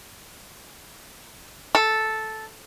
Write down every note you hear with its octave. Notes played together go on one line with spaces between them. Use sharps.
A4